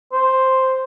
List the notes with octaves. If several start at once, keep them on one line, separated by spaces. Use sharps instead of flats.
C5